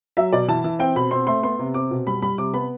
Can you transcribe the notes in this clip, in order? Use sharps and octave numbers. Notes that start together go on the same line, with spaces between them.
F#3 E5
B2 D5
E3 A5
E3
C4 G5
B2 B5
C4 C6
A3 C6
B3 C6
C3
C4 D6
B2
G3 B5
G3 B5
C3 D6
B3 B5